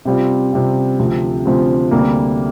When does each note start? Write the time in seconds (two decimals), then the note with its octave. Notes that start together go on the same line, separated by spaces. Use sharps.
0.05 C3 G3 C4 F4
0.52 C3 G3 C4 F4
0.99 D2 C3 F3 C4
1.45 D2 C3 F3 C4
1.91 D2 C3 G3 A#3